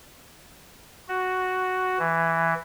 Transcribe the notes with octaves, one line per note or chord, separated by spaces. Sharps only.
F#4
E3